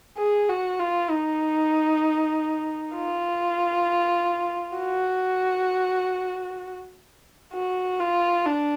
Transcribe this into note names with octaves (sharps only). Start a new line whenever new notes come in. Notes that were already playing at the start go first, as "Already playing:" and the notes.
G#4
F#4
F4
D#4
F4
F#4
F#4
F4
D4